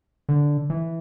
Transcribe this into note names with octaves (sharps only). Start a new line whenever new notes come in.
D3
E3